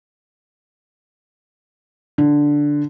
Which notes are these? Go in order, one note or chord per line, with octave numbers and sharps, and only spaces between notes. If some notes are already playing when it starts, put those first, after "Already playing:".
D3